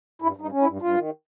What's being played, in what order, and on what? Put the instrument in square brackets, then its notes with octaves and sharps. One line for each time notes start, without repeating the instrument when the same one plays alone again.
[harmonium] G2 E4
G2 D#4
C#4
E4
G2
G2 F4
D#3